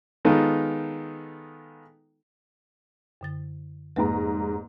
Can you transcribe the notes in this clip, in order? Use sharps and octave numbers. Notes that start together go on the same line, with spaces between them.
D#3 G#3 B3 D#4 F4 A4
F#2 D3 A6
F1 G#2 A#3 B4 F#5 A#5